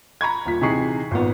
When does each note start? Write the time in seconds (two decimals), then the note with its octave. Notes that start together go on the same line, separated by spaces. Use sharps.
0.21 A#5 B5 C#6 G#6
0.46 D#1 A#2 B6
0.61 C3 E3 D#4 G#4 C#6 C7
1.11 G#1 A#2 B3